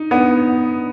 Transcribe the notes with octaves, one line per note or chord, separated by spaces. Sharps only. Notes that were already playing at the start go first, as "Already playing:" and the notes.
Already playing: D#4
B3